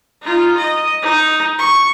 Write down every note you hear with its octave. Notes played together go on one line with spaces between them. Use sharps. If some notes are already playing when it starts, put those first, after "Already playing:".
D#4 F4
D#5
D#4
C#6